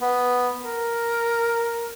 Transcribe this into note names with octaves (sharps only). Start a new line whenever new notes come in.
B3
A#4